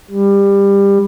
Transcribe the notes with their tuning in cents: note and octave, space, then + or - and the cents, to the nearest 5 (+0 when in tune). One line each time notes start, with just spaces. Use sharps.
G3 +20